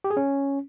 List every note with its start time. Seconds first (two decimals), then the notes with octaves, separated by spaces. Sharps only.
0.04 G4
0.11 G#4
0.17 C#4